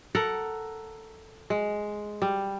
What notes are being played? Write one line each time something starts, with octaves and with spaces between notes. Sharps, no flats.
A4 A#4 F#5
G#3
G3